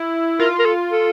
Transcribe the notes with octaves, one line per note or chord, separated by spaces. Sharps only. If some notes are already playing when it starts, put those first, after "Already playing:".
Already playing: E4
F4 A#4
A#4
A4
A4